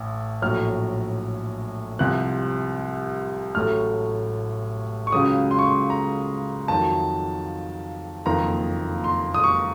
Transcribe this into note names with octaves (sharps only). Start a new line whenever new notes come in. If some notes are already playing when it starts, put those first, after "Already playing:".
Already playing: A1 A2
A#1 A2 F#3 F6
C2 C3 F3 F#6
A1 A2 F#3 A3 F6
C#6
C#2 C#3 F#3 D#6
C6
C#6
C6
A#5
F2 D#3 F#3 A5
F#1 F2 D#3 A#3 A#5
C6
D#6
C#6